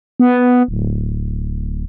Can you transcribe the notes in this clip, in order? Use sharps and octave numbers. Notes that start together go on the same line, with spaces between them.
B3
D1